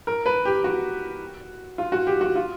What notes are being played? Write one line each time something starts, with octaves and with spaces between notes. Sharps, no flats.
A#4
B4
G4
F#4
F4
F#4
G4
F#4
F4